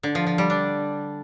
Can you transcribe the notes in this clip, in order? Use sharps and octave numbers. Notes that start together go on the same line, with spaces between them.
D3
F3
F3
G3
D4